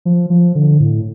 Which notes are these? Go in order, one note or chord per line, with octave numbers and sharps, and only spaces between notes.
F3
F3
D3
A2